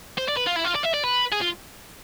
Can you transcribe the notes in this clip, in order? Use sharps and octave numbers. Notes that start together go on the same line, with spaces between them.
C5
D5
B4
F4
E4
F4
D5
E5
D5
B4
G#4
F4